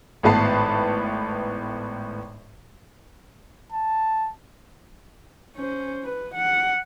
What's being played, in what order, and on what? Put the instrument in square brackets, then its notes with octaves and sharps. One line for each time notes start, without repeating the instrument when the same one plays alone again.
[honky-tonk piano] G#1 A2 B3 B4 A5 C7
[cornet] A5
[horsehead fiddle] C#4 C5
B4
F#5